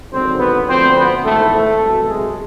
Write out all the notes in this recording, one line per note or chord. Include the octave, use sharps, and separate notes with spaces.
G#1 F#2 D3 F#3 C4 C5
B3 B4
D2 D3 F3 C4 C5
B3 B4
G#1 G#2 E3 A3 A4
A3 A4
C2 B2 F#3
G#3 G#4